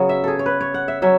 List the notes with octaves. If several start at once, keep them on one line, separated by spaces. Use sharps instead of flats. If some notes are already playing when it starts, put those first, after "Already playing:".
Already playing: C#3 F#3 B3
E5
G#4 A4
C#5
B4
C#5
F#5
E5
F#3 C#4 E5